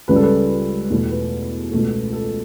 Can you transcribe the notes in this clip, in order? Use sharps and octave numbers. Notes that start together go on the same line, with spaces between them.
C#2 C#3 G3 B4
A4
B4
E2 B2 A3
B4
C#2 B2 A3
A4